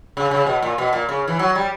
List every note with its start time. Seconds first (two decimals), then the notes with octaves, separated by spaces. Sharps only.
0.17 C#3
0.31 C#3
0.46 B2
0.62 A#2
0.78 B2
0.93 A#2
1.09 C#3
1.28 E3
1.39 F#3
1.55 G3